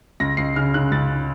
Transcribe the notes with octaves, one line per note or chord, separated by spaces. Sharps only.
C#2 A#6
C#2 C7
C#3 F6
C#3 F#6
C#2 A6